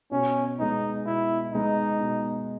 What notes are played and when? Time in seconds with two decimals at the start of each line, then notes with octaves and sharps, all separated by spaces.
0.11 B2 C#4
0.59 G#3 B3 D#4
1.06 B2 E4
1.53 G#3 B3 D#4
2.01 B2